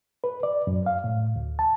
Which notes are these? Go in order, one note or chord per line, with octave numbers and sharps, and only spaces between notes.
B4
D5
F#2
F5
A2
D2
A5